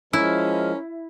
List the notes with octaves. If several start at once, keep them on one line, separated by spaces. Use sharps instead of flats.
F3 G#3 C#4 E4 A#4